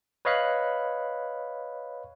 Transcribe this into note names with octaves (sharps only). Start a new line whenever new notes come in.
B4 C#5 D#5 F5 B5 F#6